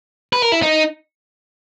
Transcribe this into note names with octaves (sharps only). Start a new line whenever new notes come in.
B4
A#4
E4
D#4